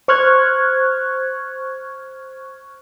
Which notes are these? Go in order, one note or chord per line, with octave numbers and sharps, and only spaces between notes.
C5 C#6 F6 F#6 G#6